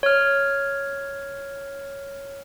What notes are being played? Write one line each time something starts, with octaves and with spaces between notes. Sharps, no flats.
C#5 F6